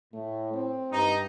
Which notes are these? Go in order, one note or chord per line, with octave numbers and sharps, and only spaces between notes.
A2 A3
C4
G2 D#4